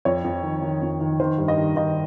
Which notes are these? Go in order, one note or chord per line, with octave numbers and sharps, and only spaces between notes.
F2 C#5
F2
D#3
D#3
F2
D#3
D#3 C5
G2
D#5
D#3
D#3 D#5